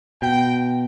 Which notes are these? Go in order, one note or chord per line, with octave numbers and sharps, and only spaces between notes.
B2 G5